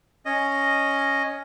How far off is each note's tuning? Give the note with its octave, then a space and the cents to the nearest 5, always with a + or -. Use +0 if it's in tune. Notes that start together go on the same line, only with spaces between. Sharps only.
C#4 +0 D#5 +0